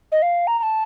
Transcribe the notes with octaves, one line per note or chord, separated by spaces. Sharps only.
D#5
F5
A#5
A#5
A5